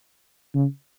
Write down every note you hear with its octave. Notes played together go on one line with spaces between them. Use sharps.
C#3